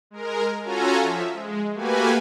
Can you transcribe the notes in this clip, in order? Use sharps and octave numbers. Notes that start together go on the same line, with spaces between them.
G#3 A#4
C#4 F4 F#4 A4 G#5 A#5
F3 E5
G#3
A3 A#3 F#4 G4 B4 G#5